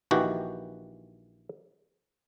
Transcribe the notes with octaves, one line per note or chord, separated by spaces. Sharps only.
A#1 D#3 E3 F#4 G4